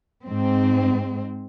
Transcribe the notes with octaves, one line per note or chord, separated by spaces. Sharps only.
G#2 C4